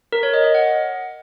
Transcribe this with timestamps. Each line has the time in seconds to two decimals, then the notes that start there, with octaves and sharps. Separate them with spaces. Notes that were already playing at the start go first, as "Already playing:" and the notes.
0.13 A#4
0.23 C#5
0.34 D#5
0.44 D#5
0.55 F#5